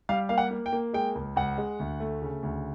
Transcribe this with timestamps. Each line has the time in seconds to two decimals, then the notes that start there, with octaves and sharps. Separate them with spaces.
0.09 G3 F5
0.29 A#3 F5
0.38 F#5
0.51 A#3
0.66 G5
0.73 A#3
0.93 G#3 G5
1.15 C#2
1.36 C#2 F#5
1.58 G#3
1.79 D2
2.00 A3
2.22 C#3
2.43 D2